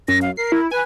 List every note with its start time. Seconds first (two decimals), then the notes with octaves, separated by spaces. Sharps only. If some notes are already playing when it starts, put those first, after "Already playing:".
0.08 F#2 A#6
0.22 F5
0.37 A#4 C7
0.52 E4
0.71 B4 G#5